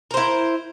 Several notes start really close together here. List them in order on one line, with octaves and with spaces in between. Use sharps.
A#4 C5 E4